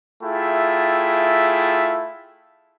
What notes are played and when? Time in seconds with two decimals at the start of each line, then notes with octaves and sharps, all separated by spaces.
0.23 A3 E4 F4 G#4 E5 G5